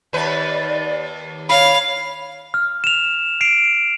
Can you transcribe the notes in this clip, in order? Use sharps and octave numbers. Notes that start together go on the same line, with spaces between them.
D#2 B4 D5
C#5 F5 B5
F6
E7 F7
C7 D7 F7